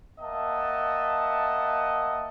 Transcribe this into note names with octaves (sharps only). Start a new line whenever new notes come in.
A#3 D#5 E5 F#5 A5